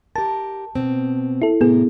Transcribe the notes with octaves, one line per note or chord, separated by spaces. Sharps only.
G4 A#4 A5
B2 C4
E4 A4
A2 C3 B3 G#4 A#4